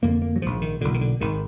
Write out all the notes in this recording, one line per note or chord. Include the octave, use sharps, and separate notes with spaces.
F1 F2 D3 A#3
A#3
F#3
A#1 G#2 F3
D#3
B1 A#2 D3
D#3
D3
G#1 G#2 D#3